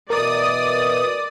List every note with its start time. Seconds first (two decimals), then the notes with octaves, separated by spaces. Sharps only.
0.10 B2 E3 A#4 D5 D#6